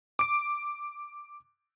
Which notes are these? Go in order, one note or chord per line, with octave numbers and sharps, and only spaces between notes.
D6 D7